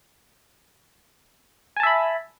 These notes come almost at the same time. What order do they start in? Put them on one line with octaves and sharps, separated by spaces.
G#5 A5 E5 B5